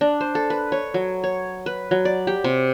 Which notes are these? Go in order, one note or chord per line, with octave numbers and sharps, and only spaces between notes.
D4
C5
A4
B4
C#5
F#3
C#5
B4
F#3
D5
G4
C3